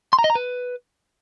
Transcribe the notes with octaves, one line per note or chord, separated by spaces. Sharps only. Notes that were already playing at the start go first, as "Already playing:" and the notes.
C6
A#5
D#5
A#5
B4